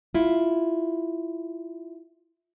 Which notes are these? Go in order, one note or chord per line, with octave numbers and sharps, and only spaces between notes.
E4 F4